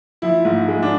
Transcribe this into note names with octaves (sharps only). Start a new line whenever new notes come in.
F3 E4
G#2
G#3
D4